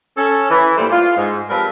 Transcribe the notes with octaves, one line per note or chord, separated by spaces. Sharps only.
C#4 A4
E3
A#2 G3 A3 A#3 C5 D5
F4
G#2
F3 G3 C4 A#4 B4 D5